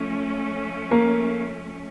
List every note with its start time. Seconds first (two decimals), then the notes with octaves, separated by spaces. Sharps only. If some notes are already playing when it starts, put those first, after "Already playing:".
Already playing: F3 A3 C#4
0.91 A#3 A#4